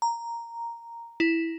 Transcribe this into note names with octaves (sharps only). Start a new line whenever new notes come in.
A#5
E4